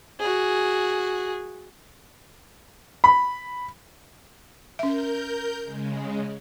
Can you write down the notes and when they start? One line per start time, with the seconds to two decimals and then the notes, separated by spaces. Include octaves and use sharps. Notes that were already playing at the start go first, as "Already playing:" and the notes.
0.20 F#4 G#4
3.04 B5
4.79 C#4 A#4 E5 G6
5.63 C#3 G#3